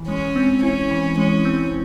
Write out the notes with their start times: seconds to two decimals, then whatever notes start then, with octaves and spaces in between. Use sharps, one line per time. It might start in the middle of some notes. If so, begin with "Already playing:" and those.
Already playing: E3
0.08 G#3 C#4
0.36 C4
0.63 C#4 E4
0.91 E3
1.18 G#3 C#4
1.45 C4